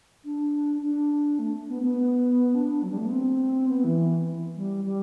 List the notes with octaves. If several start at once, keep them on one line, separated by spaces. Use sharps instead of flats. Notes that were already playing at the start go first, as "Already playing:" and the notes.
D4
D4
A3
B3
B3
D4
F#3
G3
A3
B3
C4
B3
E3
G3
G3